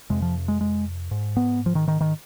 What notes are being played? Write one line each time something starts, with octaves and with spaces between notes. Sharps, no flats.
F2 C3 G#3
F3
G#3
G#3
G#2
B3
F3
D#3
D#3
D#3